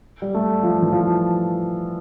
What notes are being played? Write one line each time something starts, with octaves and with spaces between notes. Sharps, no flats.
G3
A3
F3
E3
F3